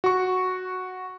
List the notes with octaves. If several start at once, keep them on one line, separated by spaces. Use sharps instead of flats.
F#4 C#6